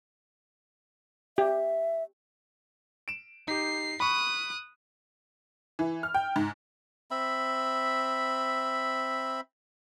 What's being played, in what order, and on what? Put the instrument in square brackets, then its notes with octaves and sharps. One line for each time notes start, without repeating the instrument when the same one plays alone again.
[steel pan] G4 [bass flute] E5
[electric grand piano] D7 E7
[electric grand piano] D#4 G4 [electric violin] C7
[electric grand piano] B5 C#6 [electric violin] D#6 F#6
[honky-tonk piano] E3
F6
G5
G#2
[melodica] C4 E5 B5